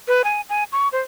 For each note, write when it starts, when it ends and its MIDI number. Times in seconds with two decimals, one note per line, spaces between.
0.08 0.22 71
0.24 0.41 80
0.49 0.64 80
0.72 0.88 85
0.92 1.00 72